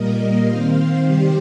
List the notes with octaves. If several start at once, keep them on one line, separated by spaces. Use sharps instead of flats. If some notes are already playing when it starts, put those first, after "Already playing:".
Already playing: A#2 G3 A#3 A#4 D#5
D#3 C4 C5 F5
C3 D#3 G3 G4 C5